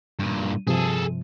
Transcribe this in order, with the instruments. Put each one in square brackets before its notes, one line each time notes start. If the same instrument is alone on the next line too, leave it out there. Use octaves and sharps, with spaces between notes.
[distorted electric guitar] G2 A#2
[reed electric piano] G2 C3 F3 [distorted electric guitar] G#4 A4